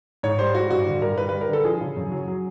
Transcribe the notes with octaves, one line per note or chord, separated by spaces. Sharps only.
G#2 C#5
G3 C5
G3 F#4
G2 F#4
D3
G2 A#4
G3 B4
G3 B4
A#4
D3 A4
F3 G#4
C#3
F#2
F#3
F#3